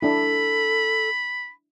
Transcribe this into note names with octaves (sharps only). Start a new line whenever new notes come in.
D4 E4 A4 B5